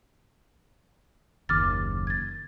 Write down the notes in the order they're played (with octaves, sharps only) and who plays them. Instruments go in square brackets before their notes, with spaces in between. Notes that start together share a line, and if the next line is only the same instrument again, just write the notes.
[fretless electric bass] F#1 D#2 [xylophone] D6 F6 A6
[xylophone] G#6 A6